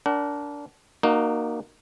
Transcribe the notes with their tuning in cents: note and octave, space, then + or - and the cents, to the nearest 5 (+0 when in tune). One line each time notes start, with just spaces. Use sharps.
D4 -20 A#4 +0 F#5 +35
A#3 +0 D#4 -25 F#4 +15